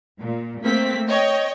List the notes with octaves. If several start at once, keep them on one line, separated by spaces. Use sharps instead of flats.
A#2
A3 A#3 C4 B6
C#5 D#5 G5